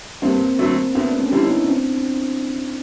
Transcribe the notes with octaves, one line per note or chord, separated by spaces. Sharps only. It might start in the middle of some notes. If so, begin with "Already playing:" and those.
G2 A#3 C4
D3 F#3 A3
D2 A3 B3
D4
B3 C#4
D3 G3 E4
C#4 D#4
C4 D4